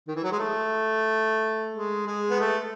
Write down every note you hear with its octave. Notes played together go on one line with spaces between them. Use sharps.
D#3
E3
F#3
G#3
A3
G#3
G#3
B3
A3